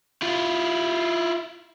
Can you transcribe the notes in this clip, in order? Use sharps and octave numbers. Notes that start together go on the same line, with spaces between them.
E4 F4